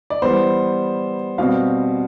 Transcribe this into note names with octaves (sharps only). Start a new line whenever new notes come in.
D5
E3 G3 B3 C5
B2 G3 C4 F5